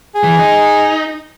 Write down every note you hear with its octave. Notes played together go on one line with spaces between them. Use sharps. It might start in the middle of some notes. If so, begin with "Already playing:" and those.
G#4
E3
D#4